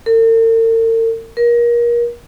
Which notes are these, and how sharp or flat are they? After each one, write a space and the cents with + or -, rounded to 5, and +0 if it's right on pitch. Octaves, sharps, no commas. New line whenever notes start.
A#4 -45
A#4 +30